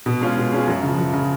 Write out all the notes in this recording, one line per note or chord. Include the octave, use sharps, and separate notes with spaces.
B2
G#3 C#4 F4 G#4
B2
G#3 C#4 F4 G#4
F#2
C#3 F3
F#2
C#3 F3